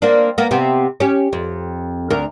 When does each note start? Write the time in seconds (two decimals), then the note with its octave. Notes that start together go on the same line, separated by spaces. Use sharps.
0.02 A#3 C4 D4
0.38 A#3 B3
0.51 C3 B3 C4
1.00 C#4 G4
1.33 F2
2.10 D2 A#4